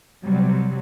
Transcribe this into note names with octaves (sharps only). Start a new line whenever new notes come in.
C3 F#3 G3